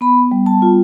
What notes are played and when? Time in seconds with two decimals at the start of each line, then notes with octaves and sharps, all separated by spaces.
0.01 B3 B5
0.31 G3
0.46 A5
0.62 F4